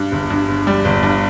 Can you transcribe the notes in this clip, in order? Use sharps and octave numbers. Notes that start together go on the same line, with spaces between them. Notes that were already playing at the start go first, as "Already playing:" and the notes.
Already playing: G2
G1
G2
G1
G3
G1
G2